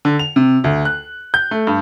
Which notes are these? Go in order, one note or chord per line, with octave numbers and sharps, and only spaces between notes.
D3
F7
C3
D2
F#6
G6
A3
G2